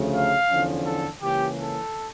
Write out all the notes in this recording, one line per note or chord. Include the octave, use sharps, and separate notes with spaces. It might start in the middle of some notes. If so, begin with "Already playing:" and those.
Already playing: D2 C#3 F3 A3
F5
E2 D3 F3 C#4
A4
C#2 C#3 E3 A#3 C#4 G4
A4